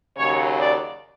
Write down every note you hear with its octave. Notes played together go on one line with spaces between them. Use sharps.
D#2 C#3 F#3 C#5
D5